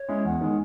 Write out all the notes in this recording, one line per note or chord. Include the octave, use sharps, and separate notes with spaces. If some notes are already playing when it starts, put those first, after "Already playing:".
Already playing: C#5
G#3 C#4 E4
E2 F#5
D#3 G#3